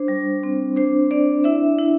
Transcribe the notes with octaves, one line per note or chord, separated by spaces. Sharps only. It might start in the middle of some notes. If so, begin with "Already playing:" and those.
Already playing: D4 C5
G3
C4
D4 C5
D4 D5
E4 E5
E4